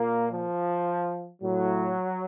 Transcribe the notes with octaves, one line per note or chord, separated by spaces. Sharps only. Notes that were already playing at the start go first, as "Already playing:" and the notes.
Already playing: A#2 A#3
F3
A2 F#3